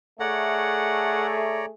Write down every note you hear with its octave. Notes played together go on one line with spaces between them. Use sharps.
A3 G#4 C#5 D5 F#5 A#5